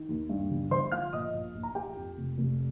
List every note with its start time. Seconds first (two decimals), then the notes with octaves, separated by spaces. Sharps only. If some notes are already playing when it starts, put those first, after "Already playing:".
Already playing: D#3
0.09 D#2
0.29 G2
0.50 G1
0.71 G1 C5 C6
0.92 F3 F5 F6
1.13 A#2 D#5 D#6
1.34 A#1
1.54 A#1
1.63 A#5
1.75 F3 G4 G5
1.96 F2
2.17 F1
2.38 F1